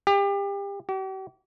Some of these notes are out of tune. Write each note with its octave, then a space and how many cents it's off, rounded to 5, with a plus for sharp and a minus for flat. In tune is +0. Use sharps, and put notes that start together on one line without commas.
G4 +30
G4 -45